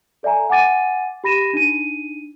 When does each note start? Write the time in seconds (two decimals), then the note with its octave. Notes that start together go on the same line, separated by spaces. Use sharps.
0.23 A4 D5 E5 G#5 A#5
0.50 F#5 G#5 D6 A6 D#7
1.24 G4 B5 A#6 D#7 E7
1.53 D4 D#4 D#7